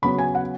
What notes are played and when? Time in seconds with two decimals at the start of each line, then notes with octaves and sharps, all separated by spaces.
0.02 C#3 F#3 B3 B5
0.18 G#5
0.35 F#5